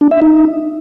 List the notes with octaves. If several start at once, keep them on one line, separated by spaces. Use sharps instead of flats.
D4
E5
D#4